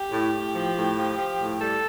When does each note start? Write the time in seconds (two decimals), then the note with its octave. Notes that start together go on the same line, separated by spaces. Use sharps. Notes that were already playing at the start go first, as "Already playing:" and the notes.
Already playing: G4
0.11 A2
0.33 A2
0.54 F3
0.76 A2
0.97 F3
1.18 F3
1.39 A2
1.60 G3 A4